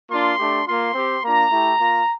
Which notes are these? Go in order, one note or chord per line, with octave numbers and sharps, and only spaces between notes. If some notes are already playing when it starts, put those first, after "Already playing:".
A#3 D4 F4 C6
A3 D4 G4
A#3 F4 C6
C4 G4
A#3 D4 F4 A#5
A3 E4 G4
A#3 F4